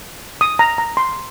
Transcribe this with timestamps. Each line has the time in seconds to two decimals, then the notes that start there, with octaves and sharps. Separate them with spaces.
0.41 D#6
0.59 A#5
0.78 A#5
0.97 C6